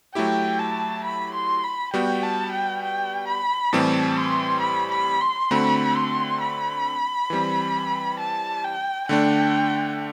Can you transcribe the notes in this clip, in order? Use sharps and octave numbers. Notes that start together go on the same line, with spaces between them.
F#3 A3 E4 G4 G5
A5
B5
C6
B5
G3 B3 F#4 G5
A5
G5
G5
B5
A2 E3 G3 C4 G4 A5
C6
B5
B5
C6
D3 A3 C4 F#4 B5
C6
B5
E3 G3 C4
A5
G5
D3 A3 D4 G5